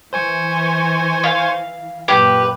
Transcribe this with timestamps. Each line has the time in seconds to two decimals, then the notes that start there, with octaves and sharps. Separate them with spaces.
0.13 E3 C5 G#5 C#6
1.24 F5
2.08 F#2 A#2 G4 B4